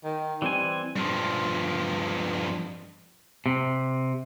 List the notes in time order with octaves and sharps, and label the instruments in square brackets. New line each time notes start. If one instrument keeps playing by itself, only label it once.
[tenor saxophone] D#3
[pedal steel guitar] E3 C4 G#5 [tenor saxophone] G3
[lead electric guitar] G2 F3
[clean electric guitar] C3